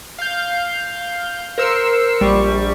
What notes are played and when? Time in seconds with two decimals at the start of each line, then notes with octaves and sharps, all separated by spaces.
0.19 F5 G6
1.58 A#4 C5 E6 C7 C#7
2.20 A#1 G3 C#6